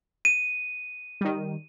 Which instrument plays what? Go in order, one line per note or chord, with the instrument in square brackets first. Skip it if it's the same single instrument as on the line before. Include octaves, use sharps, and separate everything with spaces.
[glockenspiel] D#7
[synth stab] D#3 G3